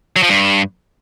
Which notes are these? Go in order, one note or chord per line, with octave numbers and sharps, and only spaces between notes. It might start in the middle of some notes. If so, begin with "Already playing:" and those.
F#3
F3
G2